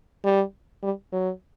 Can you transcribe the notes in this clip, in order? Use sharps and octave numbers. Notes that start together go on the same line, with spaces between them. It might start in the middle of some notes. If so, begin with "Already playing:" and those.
G3
G3
F#3